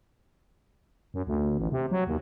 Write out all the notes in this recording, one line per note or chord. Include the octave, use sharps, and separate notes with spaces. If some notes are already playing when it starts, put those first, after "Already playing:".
F#2
D2
A1
C3
F#3
D#2